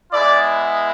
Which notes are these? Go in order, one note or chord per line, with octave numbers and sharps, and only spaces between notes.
G#3 B3 E4 D5